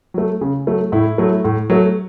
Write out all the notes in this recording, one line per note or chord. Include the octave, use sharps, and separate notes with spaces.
F#3 A3
C#3
F#3 A3
A2 E4
F#3 A3
A2
F#3 A3